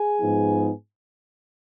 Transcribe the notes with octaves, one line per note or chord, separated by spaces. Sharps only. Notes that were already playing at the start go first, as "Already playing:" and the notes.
Already playing: G#4 G#5
G#2 F3 B3 D#4